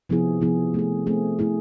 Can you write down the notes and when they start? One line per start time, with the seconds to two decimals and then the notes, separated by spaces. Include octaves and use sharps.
0.10 C3 F3 B3 E4 G#4
0.41 C3 F3 B3 E4 G#4
0.74 A3 C4 G#4
1.07 A3 C4 G#4
1.39 A3 E4 G#4